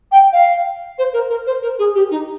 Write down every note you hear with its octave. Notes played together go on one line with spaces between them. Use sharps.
G5
F5
C5
A#4
A#4
C5
A#4
G#4
G4
D#4